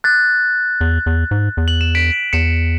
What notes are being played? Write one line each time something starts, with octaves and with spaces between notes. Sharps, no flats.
F#6 A6
E2
E2
G#2
E2
F#7
E7
B6 D7
E2 C#7 E7